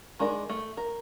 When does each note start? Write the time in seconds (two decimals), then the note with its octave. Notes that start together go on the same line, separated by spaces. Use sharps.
0.19 D#3 G#3 D4 A#4
0.50 A3
0.77 A#4